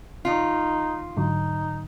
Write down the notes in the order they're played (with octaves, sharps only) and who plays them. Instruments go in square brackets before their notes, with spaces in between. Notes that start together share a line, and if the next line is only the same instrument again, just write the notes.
[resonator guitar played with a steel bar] D#3 F4 [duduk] D#4
[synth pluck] G#2 D3 F#3 [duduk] D#4